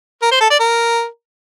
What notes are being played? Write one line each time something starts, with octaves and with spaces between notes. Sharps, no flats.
A#4
C5
A4
D5
A#4